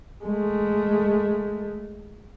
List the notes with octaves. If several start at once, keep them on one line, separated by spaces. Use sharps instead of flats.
G#3 A3